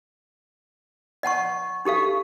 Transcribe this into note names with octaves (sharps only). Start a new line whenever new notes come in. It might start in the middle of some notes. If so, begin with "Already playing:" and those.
D#5 F#5 A5 C#6
D#4 G4 A4 F5